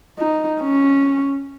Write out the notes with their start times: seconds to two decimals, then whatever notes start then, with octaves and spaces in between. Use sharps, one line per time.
0.18 D#4
0.62 C#4